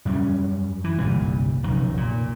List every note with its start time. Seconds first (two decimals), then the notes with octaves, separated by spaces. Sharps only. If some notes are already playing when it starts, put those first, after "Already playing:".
0.05 F#2 G3 C#4
0.84 E3
0.99 G1 C2 A#2 G3
1.63 F1 B1 F#2 D#3
1.97 A#2